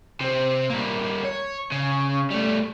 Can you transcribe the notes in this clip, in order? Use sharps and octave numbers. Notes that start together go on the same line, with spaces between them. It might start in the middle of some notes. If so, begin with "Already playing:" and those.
C3 C4
G3 A#3
C#5
C#3
G3 A3